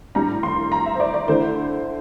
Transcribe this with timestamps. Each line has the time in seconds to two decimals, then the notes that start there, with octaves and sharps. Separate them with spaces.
0.15 A2 G3 D4 A#5
0.43 C6
0.72 A#5
0.86 E5
0.94 C5
1.00 D5
1.14 D5
1.28 D3 A3 E4 C5